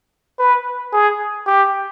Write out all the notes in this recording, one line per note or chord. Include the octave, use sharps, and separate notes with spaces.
B4
G#4
G4